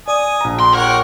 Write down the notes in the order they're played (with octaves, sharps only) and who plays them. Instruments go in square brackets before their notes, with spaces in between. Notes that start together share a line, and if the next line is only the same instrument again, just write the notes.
[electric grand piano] D5 [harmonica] G#5 D#6
[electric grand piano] A#1 A#5
[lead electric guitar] C6
[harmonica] G4 C#5 F#5 [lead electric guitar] A#4